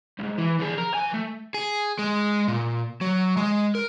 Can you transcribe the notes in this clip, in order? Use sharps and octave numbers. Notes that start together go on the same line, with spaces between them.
C2 G#2
E3
F3 G#4
A#4
F3 G#5
A3
G#4
G#3
A#2
F#3
G#3
A#4